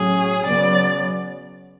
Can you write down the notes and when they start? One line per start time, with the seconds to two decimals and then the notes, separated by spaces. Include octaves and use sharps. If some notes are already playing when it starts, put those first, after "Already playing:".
Already playing: A2 F#3 C#4 G#4
0.46 C#3 F#3 B3 D5